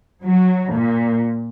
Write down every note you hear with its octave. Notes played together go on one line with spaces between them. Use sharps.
F#3
A#2